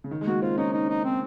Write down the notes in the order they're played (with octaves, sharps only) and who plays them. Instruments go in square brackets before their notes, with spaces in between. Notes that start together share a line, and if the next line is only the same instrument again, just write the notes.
[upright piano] C#3
D#3
G#3
[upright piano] A#3 [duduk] F#4
[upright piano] C4 [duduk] F4
[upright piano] C#4 [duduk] D#4
[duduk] D#4
D#4
C4